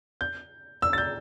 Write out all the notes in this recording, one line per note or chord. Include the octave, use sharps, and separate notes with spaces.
G6
E6
A6
G6